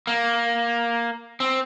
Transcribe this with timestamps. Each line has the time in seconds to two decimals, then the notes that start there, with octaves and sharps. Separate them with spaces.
0.07 A#3
1.40 C4